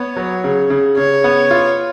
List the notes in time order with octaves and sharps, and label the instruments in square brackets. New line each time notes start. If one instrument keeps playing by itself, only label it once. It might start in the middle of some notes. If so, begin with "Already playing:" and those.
Already playing: [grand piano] B3 [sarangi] C#5
[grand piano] F#3
C#3
C#3
[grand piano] C#3 [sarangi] C#5
[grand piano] B3
F4